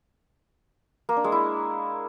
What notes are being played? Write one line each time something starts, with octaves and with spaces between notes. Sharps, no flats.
A#3
D4
G#3
E4